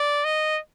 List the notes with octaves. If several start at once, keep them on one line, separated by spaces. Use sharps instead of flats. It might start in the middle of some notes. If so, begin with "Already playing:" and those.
Already playing: D5
D#5